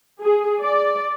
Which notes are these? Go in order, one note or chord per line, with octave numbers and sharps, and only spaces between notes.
G#4
D5